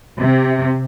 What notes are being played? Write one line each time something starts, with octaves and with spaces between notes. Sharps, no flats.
C3